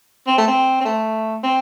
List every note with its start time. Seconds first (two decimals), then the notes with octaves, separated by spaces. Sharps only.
0.28 C4
0.38 A3
0.48 C4
0.81 C4
0.85 A3
1.43 C4